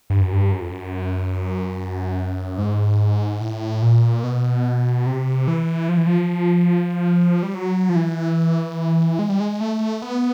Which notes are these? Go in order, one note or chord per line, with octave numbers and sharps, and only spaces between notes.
G2
F#2
G2
F#2
F2
F#2
G#2
A2
A#2
B2
C3
E3
F3
E3
F3
G3
F#3
F3
E3
G#3
G3
G#3
A3
B3